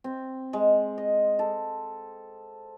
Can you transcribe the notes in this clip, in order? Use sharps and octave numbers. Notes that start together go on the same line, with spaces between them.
C4
G#3
D#5
A4